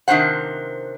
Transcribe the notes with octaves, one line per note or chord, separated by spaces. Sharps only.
C3 D#3 D4 F4 C5 F#5